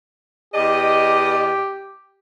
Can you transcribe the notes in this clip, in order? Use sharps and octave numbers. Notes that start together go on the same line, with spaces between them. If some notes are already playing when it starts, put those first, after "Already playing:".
E2 G4 D5 D#5